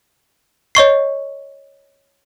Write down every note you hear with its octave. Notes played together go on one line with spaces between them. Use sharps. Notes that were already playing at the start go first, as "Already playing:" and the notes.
C#5 D#5 C#6 C7